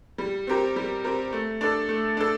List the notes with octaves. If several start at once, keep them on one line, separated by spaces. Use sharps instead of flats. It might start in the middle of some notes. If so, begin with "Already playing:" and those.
G3
C4 G4 A#4
G3
C4 G4 A#4
A3
D4 A4
A3
D4 A4